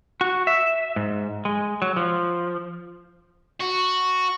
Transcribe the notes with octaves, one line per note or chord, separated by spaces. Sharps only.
F#4
E5
G#2
G#3
F#3
F3
F#4